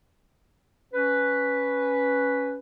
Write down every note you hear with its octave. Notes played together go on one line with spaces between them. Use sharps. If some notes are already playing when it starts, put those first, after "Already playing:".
C#4 B4